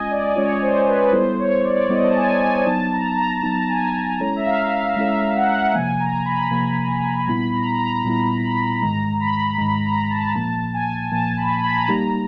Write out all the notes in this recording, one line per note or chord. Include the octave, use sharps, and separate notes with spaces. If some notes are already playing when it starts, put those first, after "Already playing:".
Already playing: G#3 C#4 F4 D#5 G#5
D5
G#3 C#4 F4 C#5
C5
B4
B4
G3 B3 E4 A4 C5
C#5
D5
G3 B3 E4 A4 D#5
A5
G#5
G#5
F#3 B3 D#4 A5
A#5
A#5
F#3 B3 D#4 A5
G#5
G#3 C#4 E4 A4 C#5 A#5
E5
F5
F5
G#3 C#4 E4 A4 C#5 E5
F5
F#5
F#5
C3 F3 A#3 G#5
A#5
B5
C3 F3 A#3
A#2 G3 B3 E4 B5
A#5
A#5
A#2 G3 B3 E4 A#5
B5
G#2 D#3 G#3 A#5
B5
G#2 D#3 G#3 B5
A#5
A5
A#2 F3 A#3 A5
G#5
A#2 F3 A#3 A5
B5
B5
A#5
A5
G3 A#3 D#4 G4 A#5